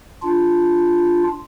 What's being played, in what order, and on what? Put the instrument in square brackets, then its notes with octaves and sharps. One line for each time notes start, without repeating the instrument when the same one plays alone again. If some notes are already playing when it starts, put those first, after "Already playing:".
[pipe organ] D4 F4